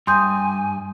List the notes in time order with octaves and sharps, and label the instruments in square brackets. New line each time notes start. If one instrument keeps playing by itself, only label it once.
[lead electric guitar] G2 [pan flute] G#5 [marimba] C6 D#6 G6